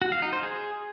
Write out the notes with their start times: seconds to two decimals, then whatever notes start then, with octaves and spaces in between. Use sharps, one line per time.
0.02 F#4
0.12 F5
0.22 D#4
0.33 C5
0.43 G#4